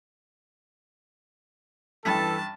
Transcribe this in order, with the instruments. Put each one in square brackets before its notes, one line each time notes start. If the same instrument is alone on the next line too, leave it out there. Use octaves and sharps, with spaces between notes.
[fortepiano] A1 G2 [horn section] E3 A4 [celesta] G5 B5 B6 [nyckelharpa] A5